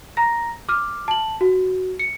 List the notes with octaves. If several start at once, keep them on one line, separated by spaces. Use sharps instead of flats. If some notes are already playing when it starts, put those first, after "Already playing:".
A#5 A#6
D6 F6
A5 F#7
F#4
C#7